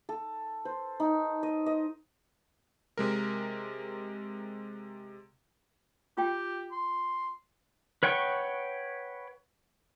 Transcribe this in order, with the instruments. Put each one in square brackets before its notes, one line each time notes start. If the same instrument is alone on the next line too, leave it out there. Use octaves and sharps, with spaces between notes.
[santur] A4
C5
D#4
D#5
D#5
[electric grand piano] C3 G#3 A#4
[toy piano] F4 G5 [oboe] G4
[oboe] C6
[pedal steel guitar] B4 C#5 F#5 G5 C#6